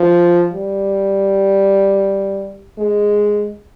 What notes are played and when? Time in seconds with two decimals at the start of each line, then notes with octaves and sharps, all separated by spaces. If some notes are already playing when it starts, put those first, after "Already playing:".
Already playing: F3
0.53 G3
2.78 G#3